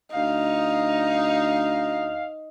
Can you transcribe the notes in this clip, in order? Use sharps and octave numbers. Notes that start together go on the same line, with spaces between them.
D2 D#4 F5